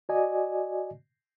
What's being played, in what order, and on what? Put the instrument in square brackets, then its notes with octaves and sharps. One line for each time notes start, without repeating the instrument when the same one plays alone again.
[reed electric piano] F#4 D5 D#5 G#5